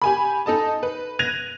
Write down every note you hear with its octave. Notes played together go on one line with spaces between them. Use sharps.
G4 G#5 B5
D#4 A4 D#5 A5
B4
F#6 G#6 A#6 D#7 F7